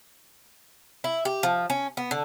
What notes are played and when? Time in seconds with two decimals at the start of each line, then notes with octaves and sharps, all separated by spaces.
1.04 E4
1.25 G4
1.43 F3
1.70 C#4
1.97 B3
2.11 D3